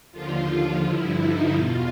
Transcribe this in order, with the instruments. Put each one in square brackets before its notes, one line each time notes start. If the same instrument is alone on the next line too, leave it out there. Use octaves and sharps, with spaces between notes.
[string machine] D#2 D3 F3 F4
G2 D3 F3 E4
D#4
E2 B2 F4